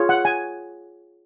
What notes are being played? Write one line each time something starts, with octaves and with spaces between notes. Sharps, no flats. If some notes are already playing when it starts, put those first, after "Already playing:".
Already playing: F4 G#4 C#5
F#5
G#5